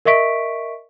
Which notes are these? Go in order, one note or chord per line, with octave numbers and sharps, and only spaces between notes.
A#4 D#5 E5 C#6 B6 D7